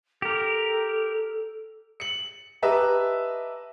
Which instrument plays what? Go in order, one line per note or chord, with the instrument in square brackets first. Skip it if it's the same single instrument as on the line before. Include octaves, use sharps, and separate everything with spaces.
[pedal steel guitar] G4 A#4 [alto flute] A4
[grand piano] C#7 F#7
G4 B4 D#5 E5 A5 A#5